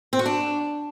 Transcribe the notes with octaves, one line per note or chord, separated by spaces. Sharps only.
C4
F#4
D4